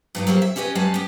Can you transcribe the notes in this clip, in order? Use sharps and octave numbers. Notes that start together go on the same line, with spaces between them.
G2 F#3 D#4
F#3 A#3 C4 G4
E5
C#4 E4 G4 B4 D#5
F#2 G3 G#3 G4 B4 A5
B3 G4